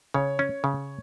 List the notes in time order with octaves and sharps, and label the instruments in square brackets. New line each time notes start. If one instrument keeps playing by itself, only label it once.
[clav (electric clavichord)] C#3 [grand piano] C#5
[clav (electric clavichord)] C#4
C#3